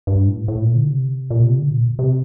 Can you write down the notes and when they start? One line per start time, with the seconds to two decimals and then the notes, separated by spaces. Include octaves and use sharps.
0.07 G2
0.27 A2
0.48 A2
0.62 A#2
0.76 D3
0.90 C3
1.31 A#2
1.44 C3
1.58 D3
1.71 A#2
1.99 C3